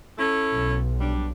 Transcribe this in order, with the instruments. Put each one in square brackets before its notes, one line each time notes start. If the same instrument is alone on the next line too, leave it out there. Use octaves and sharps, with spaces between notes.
[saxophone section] C#4 E4 A4
[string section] B1
[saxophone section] G3 D4